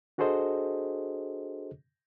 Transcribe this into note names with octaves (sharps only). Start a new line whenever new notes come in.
D4 F#4 G#4 A4 C5 D#5